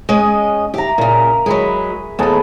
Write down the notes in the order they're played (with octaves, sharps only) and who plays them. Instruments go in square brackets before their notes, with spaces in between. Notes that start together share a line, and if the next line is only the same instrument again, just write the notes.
[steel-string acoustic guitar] G#3 C#4 D#5
[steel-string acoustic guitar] G4 [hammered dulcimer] E5 A#5
[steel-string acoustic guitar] A#2 C#3 [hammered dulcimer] A#4
[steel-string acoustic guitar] F#3 G#3 [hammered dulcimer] G#4 B5
[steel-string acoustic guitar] D#2 A3 [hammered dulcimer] B3 G#4 A4